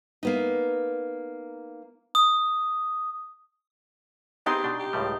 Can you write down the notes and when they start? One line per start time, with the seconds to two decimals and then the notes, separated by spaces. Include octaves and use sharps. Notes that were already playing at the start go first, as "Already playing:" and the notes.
0.23 A#3 B3 D#4
2.15 D#6
4.46 B3 C4 D#4 G4 G#4 C6
4.64 B2 D4
4.79 G4
4.93 C#2 A2 G3